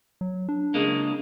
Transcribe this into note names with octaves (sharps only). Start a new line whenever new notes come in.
F#3
D4
C#3 G#3 A#3